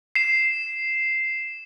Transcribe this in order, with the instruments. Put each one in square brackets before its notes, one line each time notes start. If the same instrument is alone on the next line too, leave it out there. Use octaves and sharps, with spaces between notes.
[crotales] C7 E7